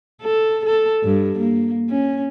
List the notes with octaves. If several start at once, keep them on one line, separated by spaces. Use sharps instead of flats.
A4
A4
G2
A#3
C#4